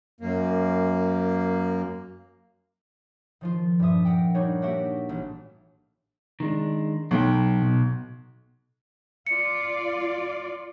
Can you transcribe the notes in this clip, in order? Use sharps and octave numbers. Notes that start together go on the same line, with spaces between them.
F#2 A#3
D#3 F3 F4
G2 A#2 F3 E5 D#6
A#4 F#5 G5
G3 D4 D#4 F#4 C#5
A#3 F#4 G4 E5 F#5 G5
A1
D#3 G#3 D4
B1 F#3 G5
B2
F4 D5 C#7